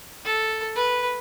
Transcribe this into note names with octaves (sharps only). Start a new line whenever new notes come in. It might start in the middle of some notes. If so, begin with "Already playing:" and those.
A4
B4